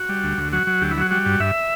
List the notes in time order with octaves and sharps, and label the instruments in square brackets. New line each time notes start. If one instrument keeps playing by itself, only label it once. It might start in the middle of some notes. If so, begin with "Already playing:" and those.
Already playing: [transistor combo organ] F#4
G3
D2
D2
F#3 F#4
F#3
D2 G4
E4
F#3 F#4
G3 F#4
G2
G2 E5